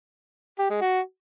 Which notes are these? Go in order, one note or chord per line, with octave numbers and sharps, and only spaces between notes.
G4
G#3
F#4